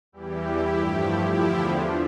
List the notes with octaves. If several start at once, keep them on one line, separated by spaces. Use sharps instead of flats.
E2 E3 G3 E4 G4
G2 F3 A3
E2 D3 F3 E4 G4
D4 F4